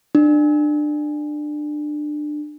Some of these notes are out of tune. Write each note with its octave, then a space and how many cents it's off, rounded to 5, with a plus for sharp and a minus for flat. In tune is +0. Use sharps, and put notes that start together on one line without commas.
D4 +25